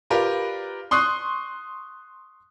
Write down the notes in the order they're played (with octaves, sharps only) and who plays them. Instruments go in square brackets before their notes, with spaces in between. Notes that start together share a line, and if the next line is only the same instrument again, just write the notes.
[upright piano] F4 G4 A#4 B4 D5
C6 C#6 D#6 F#6 C7